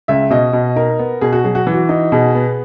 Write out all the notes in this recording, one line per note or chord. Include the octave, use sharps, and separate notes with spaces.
C#2 E5
B2 D#5
B2
D#4 A#4
B3
B2 G#4
F#4
F#3 G#4
F#4
E3
F#4
D#4
B2 G#4
B3